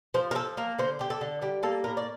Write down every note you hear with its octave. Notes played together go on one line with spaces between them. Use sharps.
F3 C5
A#4
F3 A4
A#3 A#4
D3 C5
D3 G4
A4
D3
G3 G4
A#3 A4
A2 A#4
D5